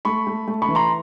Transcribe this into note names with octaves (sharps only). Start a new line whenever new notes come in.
A3 B5 C#6
A3
A3
B5 C#6
E3
A#5 C6